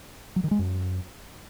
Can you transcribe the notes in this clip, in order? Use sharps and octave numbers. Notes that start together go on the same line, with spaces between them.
F#3
D#3
G#3
F#2